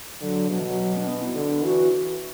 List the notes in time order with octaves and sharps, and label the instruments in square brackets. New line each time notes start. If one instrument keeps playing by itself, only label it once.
[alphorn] D3 [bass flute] F#3
[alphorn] B2 [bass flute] F#3
[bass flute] E3
F#3
D4
B3
E4
[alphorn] D3
[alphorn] E3 [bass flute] F#4